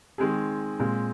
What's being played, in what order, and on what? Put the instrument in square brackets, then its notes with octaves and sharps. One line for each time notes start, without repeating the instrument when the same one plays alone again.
[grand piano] D#3 G#3 C4 G#4
A#2 G#3 C4